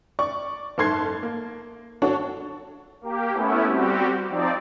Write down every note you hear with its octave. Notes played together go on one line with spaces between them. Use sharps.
D5 C#6
F#1 G#2 A4 C6 G#6 C7
A#3
D4 F#4 A4 C#5
A#3 G4
A3 B3 C#4 E4
G3 C4 F#4 G4
F3 C4 D#4 D5